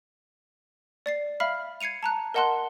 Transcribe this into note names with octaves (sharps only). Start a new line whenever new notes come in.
D5 A6 C7
E5 F5 B5 F6 C7
G#6 C7 C#7 D#7 F7
A5 A#5 F#6
A#4 D#5 F#5 A5 C6 F#6